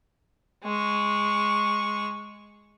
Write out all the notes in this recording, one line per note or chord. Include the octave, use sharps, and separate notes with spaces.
G#3 C#6